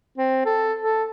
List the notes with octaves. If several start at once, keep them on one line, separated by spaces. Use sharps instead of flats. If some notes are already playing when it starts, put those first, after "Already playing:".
C4
A4
A4